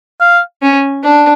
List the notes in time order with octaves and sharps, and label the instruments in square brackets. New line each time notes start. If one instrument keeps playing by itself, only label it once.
[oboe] F5
[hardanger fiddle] C#4
D4